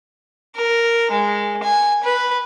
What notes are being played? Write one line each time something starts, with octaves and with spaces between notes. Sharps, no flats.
A#4
G#3
G#5
B4